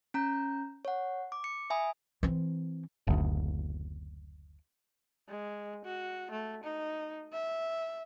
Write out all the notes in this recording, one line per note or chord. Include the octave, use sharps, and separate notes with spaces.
C#4 A#5 G6
C#5 F#5
D6
C#7
E5 G#5 B5 D#6
E3 C4
F#1 D2
G#3
F#4
A3
D#4
E5